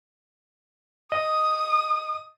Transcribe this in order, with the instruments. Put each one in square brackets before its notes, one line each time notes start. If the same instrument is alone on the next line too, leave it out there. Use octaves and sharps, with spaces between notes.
[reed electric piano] D#5 [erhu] D#6